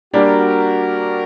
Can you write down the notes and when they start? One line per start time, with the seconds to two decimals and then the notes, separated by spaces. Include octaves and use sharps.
0.14 G3 A#3 D4 F#4 G4 A#4